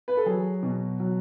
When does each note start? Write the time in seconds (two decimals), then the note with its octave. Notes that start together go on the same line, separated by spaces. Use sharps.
0.08 B4
0.17 A4
0.26 F#3 G#4
0.63 B2
1.00 F#3